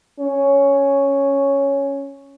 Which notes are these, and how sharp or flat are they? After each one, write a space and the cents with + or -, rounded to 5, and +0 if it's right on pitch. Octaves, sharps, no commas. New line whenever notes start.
C#4 +0